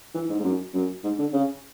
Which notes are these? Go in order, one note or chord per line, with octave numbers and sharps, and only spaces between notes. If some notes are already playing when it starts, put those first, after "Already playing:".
E3
G#2
G#2
F#2
F#2
G#2
D3
C#3